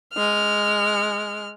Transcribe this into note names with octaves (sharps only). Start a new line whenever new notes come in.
G#3 F6